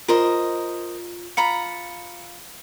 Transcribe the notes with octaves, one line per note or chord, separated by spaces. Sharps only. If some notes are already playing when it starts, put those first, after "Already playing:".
F4 A#4 C5 D#5
F4 A#5 B5 C#7